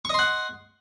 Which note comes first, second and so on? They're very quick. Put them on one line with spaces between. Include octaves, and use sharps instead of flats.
C#6 D#5 C6 F#5